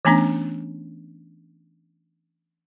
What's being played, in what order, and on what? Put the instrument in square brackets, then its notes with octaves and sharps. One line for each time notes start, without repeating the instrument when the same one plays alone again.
[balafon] E3 A3 B3 C#4 D4